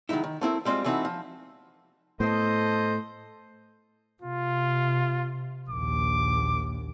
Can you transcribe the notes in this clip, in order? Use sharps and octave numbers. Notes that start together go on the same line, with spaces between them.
D#3 F#3 G#3 D#4 E4
D#3
A3 C4 E4 A#4
G3 G#3 C4 C#4 F4
E3 A3 C4 D#4 E4 F#4
F3
A2 B3 A4 C5 D#5
C3 F4
A#1 D#2 D6